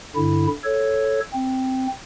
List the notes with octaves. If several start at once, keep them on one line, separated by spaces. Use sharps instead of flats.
G2 D3 E4
A4 C#5
C4